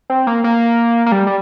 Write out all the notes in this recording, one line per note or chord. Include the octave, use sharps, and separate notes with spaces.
C4
A#3
A#3
A#3
G3
G3